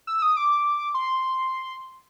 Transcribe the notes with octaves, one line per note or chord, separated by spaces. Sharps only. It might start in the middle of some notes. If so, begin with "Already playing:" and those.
E6
D#6
D6
C6